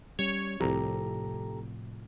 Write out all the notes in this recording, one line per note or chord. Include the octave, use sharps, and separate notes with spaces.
G3 C#4 C#5
C2 A2 C3 F3 G4 A4 A#5